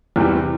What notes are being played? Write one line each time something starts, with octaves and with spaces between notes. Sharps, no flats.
E2 C3 E3 G3